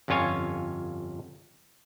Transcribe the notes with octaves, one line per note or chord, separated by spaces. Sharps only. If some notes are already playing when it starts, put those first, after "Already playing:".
G1 F2 C#4 F4 C#5 G#5